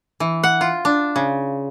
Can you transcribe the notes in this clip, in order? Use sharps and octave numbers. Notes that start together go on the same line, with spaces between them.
E3
F#5
F4
D4
C#3